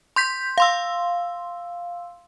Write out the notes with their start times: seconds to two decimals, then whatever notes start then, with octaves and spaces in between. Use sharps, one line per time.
0.16 C6 G6 B6
0.58 F5 C6 E6